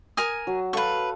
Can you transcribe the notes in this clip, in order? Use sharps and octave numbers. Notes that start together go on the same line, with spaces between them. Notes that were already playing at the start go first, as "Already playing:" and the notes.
A#4 G#5 D#6
F#3
A4 B4 F5 C#6